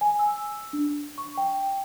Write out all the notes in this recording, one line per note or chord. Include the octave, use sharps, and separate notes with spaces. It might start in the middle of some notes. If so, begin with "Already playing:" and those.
G#5
E6
D4
C#6
G5